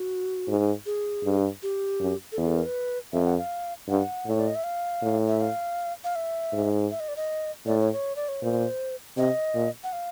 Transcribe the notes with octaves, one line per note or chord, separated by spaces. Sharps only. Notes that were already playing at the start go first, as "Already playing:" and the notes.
Already playing: F#4
G#2
G#4
G2
G4
F#2
A4
E2 G#4
A4
A#4
B4
F2 E5
F#5
F5
G2 F#5
A2 C#5
D5
D#5
E5
F5
A2
E5
F5
F5
E5
G#2
E5
D#5
D5
D#5
A2 D5
C#5
C#5
D5
C#5
A#2 C5
C3 D#5
A#2
F#5
F5